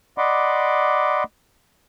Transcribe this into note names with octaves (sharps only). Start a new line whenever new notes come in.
D5 D#5 F#5 B5 C6 D6